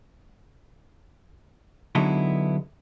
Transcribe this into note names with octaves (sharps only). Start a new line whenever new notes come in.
D3 F#3 G#3 B3 D#4 E4